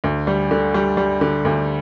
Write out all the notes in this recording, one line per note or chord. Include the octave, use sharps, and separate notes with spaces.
D2
G3
D3
G3
G3
D3
D2